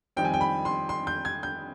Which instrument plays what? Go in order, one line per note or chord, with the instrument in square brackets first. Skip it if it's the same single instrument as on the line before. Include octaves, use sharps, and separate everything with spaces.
[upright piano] F2 D#3 G3 C4 G5
G#5
G5
B5
C6
C6
G6
G#6
G6